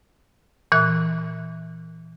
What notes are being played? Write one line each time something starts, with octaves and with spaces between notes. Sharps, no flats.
A#2 E3 F#6